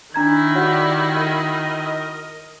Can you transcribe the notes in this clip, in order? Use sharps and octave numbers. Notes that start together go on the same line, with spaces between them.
D#3 D4 E4 A#5 G#6
F#4 G4 C#5 D5 F#5
A#4 D#5